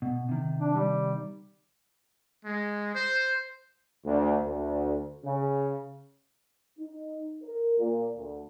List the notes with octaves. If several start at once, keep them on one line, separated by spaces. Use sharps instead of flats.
B2
C3 D#3
D4
G3
G#3
C5
D2
D2
C#3
D#4
A#4
A#2
D2